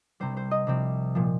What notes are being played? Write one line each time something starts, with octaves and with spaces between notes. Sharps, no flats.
C2 C3 G3 C5
C5
D#5
C2 C3 F3 C4
A#2 F3